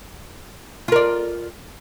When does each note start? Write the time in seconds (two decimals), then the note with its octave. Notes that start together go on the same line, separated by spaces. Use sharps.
0.88 F4
0.92 A#4
0.96 D5